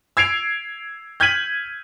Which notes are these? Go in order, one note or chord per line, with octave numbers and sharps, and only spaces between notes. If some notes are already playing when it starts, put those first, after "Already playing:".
E6 G#6 C7 D7 F7
F6 G6 G#6 B6 D#7 F#7